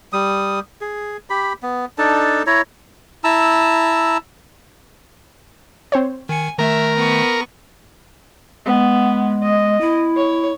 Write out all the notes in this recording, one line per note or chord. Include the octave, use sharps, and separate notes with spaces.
G3 D#6
G#4
G4 B5
B3
D4 D#4 A4 A5
E4 C#5 A#5
E4 A5 A#5 E6
C4 C5 C#5
D#3 G#5 C#7
D#3 A3 A#4 E5
B3 C#6
G#3 B3
D#5
E4
C#5